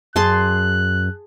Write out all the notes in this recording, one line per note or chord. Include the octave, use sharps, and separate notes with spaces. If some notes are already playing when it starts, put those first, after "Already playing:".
F#2 G#4 A5 C6 F#6